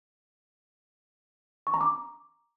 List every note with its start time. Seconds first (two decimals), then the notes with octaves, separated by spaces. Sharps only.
1.67 C#6
1.74 A#5
1.81 D6